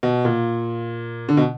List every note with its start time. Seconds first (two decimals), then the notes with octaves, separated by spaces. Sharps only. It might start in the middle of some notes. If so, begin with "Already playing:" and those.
0.03 B2
0.25 A#2
1.29 D3
1.37 B2